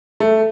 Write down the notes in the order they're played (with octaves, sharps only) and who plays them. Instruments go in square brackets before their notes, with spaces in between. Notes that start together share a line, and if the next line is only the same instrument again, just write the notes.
[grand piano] A3